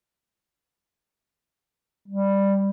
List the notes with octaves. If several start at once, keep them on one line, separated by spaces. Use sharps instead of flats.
G3